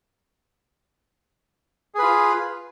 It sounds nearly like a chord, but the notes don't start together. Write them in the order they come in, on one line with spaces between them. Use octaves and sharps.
G#4 B4 F4